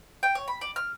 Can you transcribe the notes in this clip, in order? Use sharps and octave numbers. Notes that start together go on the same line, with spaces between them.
G5
C#5
B5
D5
F6